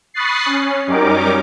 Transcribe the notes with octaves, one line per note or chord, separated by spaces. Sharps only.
B5 C#6 D#6 F#6 A6 C7
C#4
F#2 G3 C#4 D#4 A#4 D6